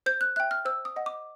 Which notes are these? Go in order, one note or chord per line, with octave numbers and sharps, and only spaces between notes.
C5 G6
F#6
E5 G5 F#6
F6
C5 E6
D#6
D#5 F#5
D6